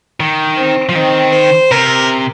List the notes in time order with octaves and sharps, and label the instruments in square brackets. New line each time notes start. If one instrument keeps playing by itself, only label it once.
[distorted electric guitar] D#3
[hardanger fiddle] C4
[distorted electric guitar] F3
[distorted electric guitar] D#3 [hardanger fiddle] C4
[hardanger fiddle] C5
[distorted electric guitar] C3 [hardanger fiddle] A#4